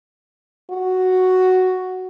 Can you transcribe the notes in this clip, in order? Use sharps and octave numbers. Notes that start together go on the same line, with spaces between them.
F#4